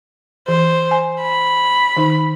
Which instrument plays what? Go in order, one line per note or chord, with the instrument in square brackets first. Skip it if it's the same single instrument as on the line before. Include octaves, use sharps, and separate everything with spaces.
[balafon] E3 [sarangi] C5
[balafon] G#5
[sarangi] B5
[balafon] D#3 D#4